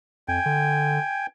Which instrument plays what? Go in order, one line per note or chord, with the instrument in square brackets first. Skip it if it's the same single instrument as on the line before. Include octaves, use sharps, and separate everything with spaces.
[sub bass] F2 [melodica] G5 G#5
[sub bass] D3